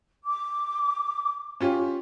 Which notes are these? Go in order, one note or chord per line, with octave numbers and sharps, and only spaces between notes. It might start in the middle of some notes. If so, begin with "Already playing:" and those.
D6
C#4 F4 G4